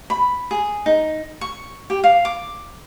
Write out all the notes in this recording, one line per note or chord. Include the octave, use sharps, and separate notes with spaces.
B5
G#4
D#4
C#6
G4
F5
D6